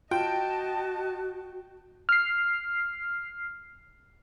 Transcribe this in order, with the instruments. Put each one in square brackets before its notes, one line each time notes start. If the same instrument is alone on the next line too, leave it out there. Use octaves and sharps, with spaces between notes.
[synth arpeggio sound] F4 [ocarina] F#4 [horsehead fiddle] D#5 A5 [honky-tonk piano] G5
[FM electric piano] F6 C7